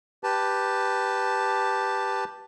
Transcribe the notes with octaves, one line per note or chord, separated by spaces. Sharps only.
G4 B4 A5